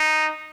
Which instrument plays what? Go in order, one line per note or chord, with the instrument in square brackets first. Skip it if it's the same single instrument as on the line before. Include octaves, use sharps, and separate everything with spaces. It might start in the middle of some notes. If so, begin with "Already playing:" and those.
Already playing: [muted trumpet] D#4